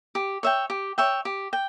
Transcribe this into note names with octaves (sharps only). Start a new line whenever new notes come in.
G4
C#5 E5 G5
G4
C#5 E5 G5
G4
G5